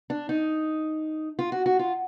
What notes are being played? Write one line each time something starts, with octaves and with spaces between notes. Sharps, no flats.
D4
D#4
F4
F#4
F#4
F4